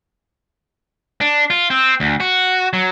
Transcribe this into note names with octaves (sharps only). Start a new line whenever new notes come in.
D4
F4
C4
D2
F#4
F#3